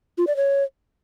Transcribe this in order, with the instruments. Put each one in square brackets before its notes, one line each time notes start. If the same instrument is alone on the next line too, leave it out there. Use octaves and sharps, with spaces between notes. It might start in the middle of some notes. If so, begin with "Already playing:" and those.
[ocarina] F4
D5
C#5